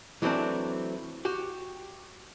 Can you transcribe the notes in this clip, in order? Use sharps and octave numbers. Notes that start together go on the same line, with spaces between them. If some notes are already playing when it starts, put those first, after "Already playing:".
E3 F#3 A3 C4 D4
F#4 G4